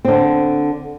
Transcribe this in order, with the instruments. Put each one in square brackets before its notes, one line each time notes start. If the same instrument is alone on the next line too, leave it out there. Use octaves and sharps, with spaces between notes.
[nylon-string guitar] D3 C4